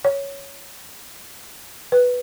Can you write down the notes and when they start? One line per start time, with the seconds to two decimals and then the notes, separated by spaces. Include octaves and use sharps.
0.05 C#5
1.92 B4